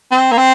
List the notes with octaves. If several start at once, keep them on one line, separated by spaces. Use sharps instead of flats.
C4
A#3
C4